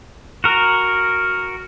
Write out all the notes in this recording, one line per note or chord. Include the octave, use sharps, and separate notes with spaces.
F#4 A#4